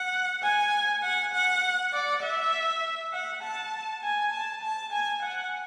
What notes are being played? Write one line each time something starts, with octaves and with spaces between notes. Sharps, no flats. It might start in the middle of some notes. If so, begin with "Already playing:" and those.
Already playing: F#5
G#5
F#5
F#5
D5
E5
F#5
A5
G#5
A5
A5
G#5
F#5